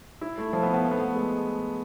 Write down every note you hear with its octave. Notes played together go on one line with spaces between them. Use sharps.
E4
A3
F3
B3
B3
A3
B3
A3
G#3